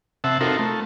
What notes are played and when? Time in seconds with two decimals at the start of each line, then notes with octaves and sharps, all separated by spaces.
0.24 C3 E5 F#5 A5
0.41 C4 D#4 F4 F#4 A4 A#4
0.59 A3